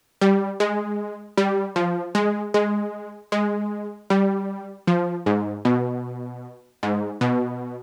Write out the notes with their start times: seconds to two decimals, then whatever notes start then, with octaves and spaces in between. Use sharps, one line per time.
0.21 G3
0.60 G#3
1.37 G3
1.76 F3
2.15 G#3
2.54 G#3
3.32 G#3
4.10 G3
4.87 F3
5.26 G#2
5.65 B2
6.83 G#2
7.21 B2